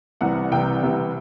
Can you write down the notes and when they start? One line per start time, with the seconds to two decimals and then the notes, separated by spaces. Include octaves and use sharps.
0.21 C2 C3 E3 F#5
0.51 C2 C3 E3 G5
0.82 C2 C3 E3